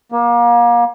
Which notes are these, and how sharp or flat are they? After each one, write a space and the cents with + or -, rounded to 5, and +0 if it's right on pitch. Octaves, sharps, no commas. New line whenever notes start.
A#3 +30